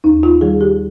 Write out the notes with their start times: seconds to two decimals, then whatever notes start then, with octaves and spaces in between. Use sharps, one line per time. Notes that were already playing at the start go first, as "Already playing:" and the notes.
0.04 D#2 D#4
0.23 F4
0.41 D#3 G3 G#4
0.61 G4